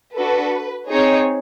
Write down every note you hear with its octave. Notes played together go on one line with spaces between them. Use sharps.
D4 F#4 A4 B4
C4 D#4 G#4 C#5